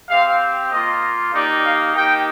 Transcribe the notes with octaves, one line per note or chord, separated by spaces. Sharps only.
C4 G4 F5
A#3 F4 D#5
A#3 D#4 G4 D5
F5
A#3 D#4 G4 G5